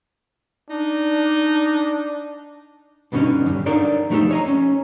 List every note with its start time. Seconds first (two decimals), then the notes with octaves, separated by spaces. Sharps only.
0.70 D4 D#4
3.12 G2 B2 D3 A#3 C#4 D#4
3.46 E2 G2
3.66 D4 D#4 A4 A#4 C#5 D5
4.10 F3 A3 D#4 F#4 G4 A4
4.31 C#5 D#5 A#5
4.48 C#4